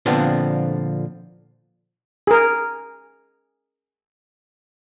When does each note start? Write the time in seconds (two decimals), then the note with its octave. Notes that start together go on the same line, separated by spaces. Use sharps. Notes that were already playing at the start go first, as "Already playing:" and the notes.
0.06 A#2 D3 F3 B3 C4 D4
2.27 G#4 A#4